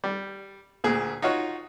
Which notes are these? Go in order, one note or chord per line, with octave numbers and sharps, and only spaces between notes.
G3
D2 A#2 G#4
D#4 F4 F#4 C#5